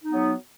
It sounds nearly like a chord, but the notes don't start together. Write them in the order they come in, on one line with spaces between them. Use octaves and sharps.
D#4 B3 F#3